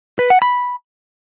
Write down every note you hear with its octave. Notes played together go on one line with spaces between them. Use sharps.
B4
F#5
B5